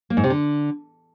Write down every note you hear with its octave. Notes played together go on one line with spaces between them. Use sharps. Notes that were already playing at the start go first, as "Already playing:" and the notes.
A#3
G#2
C3
D3